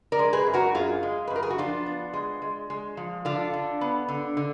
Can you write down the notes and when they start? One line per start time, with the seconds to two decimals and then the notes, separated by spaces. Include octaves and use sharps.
0.12 A#4 D5
0.19 G#3
0.33 G#4 B4
0.46 F#2
0.54 F#4 A#4
0.75 F#2 F4 G#4
1.03 G#3
1.28 B4
1.30 F#2
1.36 A#4
1.43 G#4
1.50 F#4
1.58 F3 D4 F4
1.86 B3
2.13 G#3
2.42 G#3
2.70 G#3
2.97 F3
3.25 D3 D4 F4
3.53 D3
3.81 B3
4.09 D3
4.37 D3